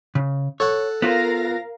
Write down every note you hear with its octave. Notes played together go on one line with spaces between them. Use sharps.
C#3
A4 C#5 F#5
B3 F4 A#4 C5 F5 A#6